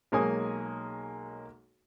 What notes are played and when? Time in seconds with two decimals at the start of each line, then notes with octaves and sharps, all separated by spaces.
0.12 B1 G#3 A#3 C#5 G#5 D#6